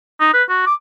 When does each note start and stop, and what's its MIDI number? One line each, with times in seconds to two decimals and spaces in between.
0.20 0.32 63
0.33 0.43 71
0.49 0.65 66
0.66 0.74 86